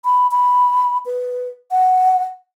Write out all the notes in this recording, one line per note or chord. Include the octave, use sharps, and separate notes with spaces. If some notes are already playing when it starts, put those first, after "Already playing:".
B5
B5
B4
F#5